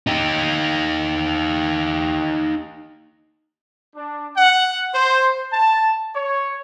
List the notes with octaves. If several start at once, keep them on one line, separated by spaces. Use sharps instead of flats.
D#4 G4
D4
F#5
C5
A5
C#5